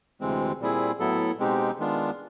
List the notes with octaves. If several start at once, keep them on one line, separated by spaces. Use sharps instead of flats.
D2 C3 E3 G#3 C4
A#2 G3 C4 E4 G#4
A2 F#3 B3 E4 A4
B2 G#3 C4 D#4 G4
D#3 G#3 B3 D4 F4